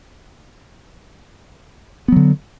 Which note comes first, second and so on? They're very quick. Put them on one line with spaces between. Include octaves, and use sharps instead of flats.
B3 F#3 D3